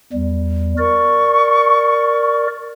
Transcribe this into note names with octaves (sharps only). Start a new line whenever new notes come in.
E2 G3
A#4 D5 C#6